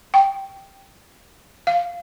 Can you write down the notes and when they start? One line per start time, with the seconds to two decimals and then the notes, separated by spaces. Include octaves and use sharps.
0.14 G5
1.67 F5